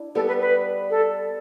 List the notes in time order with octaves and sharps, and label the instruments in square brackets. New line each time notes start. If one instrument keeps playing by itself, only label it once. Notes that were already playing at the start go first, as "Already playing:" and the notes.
Already playing: [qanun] D4 E4
[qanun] G3 B3 [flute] A4
[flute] B4
B4
A4